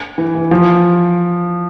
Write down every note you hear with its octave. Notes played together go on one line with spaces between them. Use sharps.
E3
E3
F3